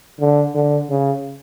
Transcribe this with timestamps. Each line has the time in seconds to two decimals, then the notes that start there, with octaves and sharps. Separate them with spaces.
0.20 D3
0.55 D3
0.90 C#3